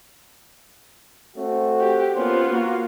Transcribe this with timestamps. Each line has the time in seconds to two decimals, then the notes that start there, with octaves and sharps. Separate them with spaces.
1.37 A3 C4 F#4
1.81 G4
2.16 A#3 B3 C#4 F4 C5
2.51 A#3 F#4